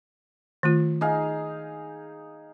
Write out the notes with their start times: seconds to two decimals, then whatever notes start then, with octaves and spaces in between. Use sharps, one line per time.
0.63 D#3 A3 F4
1.01 D#4 G#4 F5